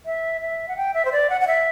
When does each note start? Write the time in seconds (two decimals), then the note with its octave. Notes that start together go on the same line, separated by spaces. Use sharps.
0.06 E5
0.41 E5
0.68 F#5
0.77 G5
0.94 E5
1.05 C5
1.12 D5
1.30 F#5
1.41 F#5
1.47 E5